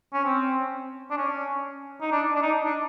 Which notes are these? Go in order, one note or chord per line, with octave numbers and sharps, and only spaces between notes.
C#4
C4
D4
C#4
D#4
D4
D4
D#4
D4